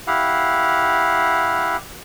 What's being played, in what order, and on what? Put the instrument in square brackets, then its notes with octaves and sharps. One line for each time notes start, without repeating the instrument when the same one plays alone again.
[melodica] E4 G4 F5 F#5